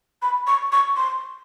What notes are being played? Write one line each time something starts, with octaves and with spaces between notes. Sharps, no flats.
B5
C#6
C#6
C6